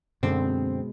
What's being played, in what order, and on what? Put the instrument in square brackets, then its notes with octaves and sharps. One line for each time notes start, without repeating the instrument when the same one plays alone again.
[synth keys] F#2 D3 C4 [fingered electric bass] B2 G#3